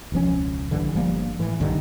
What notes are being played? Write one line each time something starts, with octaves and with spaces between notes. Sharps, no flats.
E1 C#2 F3 C#4
A#1 G2 D3 E3
G1 F3 G3 A#3
A2 E3
A#1 G2 D3 D#3